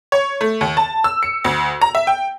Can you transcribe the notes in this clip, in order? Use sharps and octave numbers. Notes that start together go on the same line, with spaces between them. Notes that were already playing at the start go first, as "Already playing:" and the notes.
C#5
A3
D#2
A5
E6
C#7
D2
A#5
E5
G5